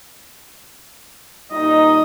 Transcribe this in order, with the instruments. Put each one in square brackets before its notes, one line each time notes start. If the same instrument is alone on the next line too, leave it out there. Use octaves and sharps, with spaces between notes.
[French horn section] A#2 G3 D#4 [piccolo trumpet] D#5